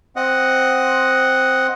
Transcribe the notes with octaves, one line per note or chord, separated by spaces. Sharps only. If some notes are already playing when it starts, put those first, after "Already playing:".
C4 D#5 F#5